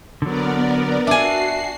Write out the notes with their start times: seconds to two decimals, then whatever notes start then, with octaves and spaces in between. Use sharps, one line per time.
0.22 D3 F#3 B3 A#4 D5
1.07 D4 F#4 E5 G#5 C7